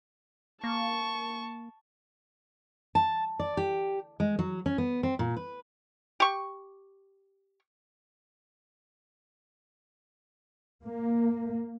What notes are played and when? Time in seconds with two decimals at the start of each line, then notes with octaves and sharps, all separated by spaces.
0.64 A#3 A5 C#6
2.95 A5
3.40 D5
3.57 G4
4.20 G#3
4.39 F#3
4.66 C#4
4.78 B3
5.03 C4
5.19 A#2
5.36 B4
6.20 G4 C#6
10.84 A#3